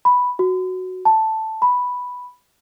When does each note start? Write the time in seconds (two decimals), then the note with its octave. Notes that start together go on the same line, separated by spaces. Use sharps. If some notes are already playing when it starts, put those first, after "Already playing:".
0.05 B5
0.39 F#4
1.05 A5
1.62 B5